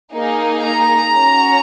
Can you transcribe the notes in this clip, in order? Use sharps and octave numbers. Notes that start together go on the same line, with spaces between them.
A#3 D#4 G#4
A#5
C#4 F#4